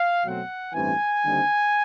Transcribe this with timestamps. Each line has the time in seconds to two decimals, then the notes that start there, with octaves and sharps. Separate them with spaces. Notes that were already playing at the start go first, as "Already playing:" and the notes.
Already playing: F5
0.24 B2 F#3 A3 C4 F#5
0.74 A1 G2 E3 A3 C4 G#5
1.24 D#2 D3 G3 C4 D#4